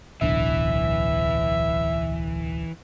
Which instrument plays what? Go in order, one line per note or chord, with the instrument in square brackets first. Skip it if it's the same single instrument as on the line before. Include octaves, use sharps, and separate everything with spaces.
[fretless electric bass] D1 B1 D4 [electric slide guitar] E3 [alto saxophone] E5